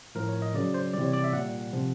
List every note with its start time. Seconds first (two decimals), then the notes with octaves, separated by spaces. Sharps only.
0.15 A2 F3 A#4
0.29 C#5
0.42 D#5
0.54 C#3 F#3 D5
0.74 C5
0.93 C3 E3 G3 D5
1.04 C#5
1.13 D5
1.24 E5
1.33 A#2 G3 F#5
1.73 C3 F3